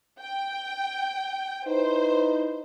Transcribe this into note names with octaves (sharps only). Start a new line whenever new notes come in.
G5
D#4 E4 B4 C5